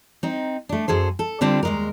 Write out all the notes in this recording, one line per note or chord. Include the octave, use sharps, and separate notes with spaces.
C4 D#4
A3 D4
F#2 G#4 A4 C5
A4
D3 G3 C4 D4 F4
D#2 G#3 A#4